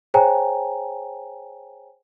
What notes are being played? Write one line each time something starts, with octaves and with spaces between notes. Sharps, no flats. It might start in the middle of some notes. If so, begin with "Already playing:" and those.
G#4 C5 C#5 G5 G#5 A#5